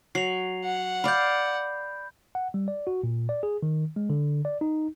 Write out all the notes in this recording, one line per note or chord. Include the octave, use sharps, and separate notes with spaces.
F#3 C7 F7
F#5
D5 F5 B5 G6
F#5
G3
D5
F#4
A#2
D5
G#4
D#3
G#3
D3
D5
D#4